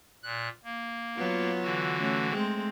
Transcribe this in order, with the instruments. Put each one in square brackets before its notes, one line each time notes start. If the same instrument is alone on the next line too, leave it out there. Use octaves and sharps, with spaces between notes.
[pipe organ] A#2 F#6
A#3
[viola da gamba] F#3 B3 F4
[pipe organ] D3 E3 F#4
[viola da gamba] A3 C#4
G#3 A3 C4